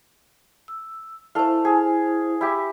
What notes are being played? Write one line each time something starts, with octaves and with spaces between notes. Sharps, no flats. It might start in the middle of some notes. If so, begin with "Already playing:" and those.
E6
A3 E4 A4 C5 F5
G#4
E4 G4